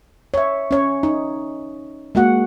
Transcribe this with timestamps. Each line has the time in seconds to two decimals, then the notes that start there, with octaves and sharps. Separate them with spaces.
0.34 C#5 E5
0.71 C#4 C#5
1.03 D#4
2.15 G#3 A#3 F#4 F#5